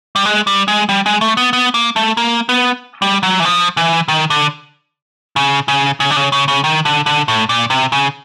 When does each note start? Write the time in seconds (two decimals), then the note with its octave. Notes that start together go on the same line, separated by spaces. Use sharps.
0.16 G3
0.25 G#3
0.47 G3
0.68 G#3
0.89 G3
1.06 G#3
1.21 A3
1.37 B3
1.53 B3
1.74 A#3
1.96 A3
2.17 A#3
2.49 B3
3.02 G3
3.23 F#3
3.40 E3
3.45 F3
3.77 E3
4.08 D#3
4.30 D3
5.36 C#3
5.68 C#3
6.00 C#3
6.10 D3
6.16 C#3
6.32 C#3
6.48 C#3
6.64 D#3
6.85 D3
7.06 D3
7.28 A2
7.49 A#2
7.70 C3
7.92 C#3